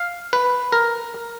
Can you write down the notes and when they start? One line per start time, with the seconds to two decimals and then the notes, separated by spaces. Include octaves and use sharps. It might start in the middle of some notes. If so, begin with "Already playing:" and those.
Already playing: F5
0.33 B4
0.72 A#4